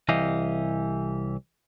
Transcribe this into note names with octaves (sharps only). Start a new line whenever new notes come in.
C2 E3 G4 D#5 F5